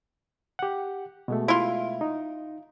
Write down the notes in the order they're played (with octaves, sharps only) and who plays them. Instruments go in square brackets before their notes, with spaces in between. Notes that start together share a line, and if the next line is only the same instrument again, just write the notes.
[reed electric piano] G4 F#5
B2 G#3 A3
[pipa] E4 F4
[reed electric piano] D#4